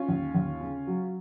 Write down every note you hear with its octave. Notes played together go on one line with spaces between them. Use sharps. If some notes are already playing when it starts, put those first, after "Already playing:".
Already playing: C#4 F4
D#2
D#2
C#3
F#3